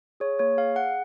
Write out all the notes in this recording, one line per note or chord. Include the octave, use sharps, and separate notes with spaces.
G#4 C#5
A#3 C#5
G#4 F5
G#4 F#5